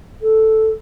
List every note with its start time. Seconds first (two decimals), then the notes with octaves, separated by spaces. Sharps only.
0.22 A4